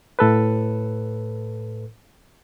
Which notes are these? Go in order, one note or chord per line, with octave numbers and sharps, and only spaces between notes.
A2 A4 B4